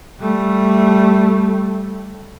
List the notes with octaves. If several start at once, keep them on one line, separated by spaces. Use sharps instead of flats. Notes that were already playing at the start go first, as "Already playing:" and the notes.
G3 A3